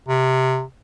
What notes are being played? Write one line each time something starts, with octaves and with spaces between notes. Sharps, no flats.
C3